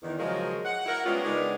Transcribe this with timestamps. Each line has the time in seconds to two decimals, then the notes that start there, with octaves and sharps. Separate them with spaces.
0.03 E2 D#3
0.19 C#3 F3 F#3 G#3 A#4 D#5
0.65 F#5
0.86 E4 A#4 F#5
1.05 G3 G#3 B3 C#4 F4
1.24 C#3 G#3 B3 D4 D#4 A#4